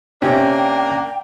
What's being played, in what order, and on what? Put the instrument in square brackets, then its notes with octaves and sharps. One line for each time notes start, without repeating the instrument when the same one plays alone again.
[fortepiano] C3 [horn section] A#3 D4 A#4 [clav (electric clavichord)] C#4 [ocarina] G5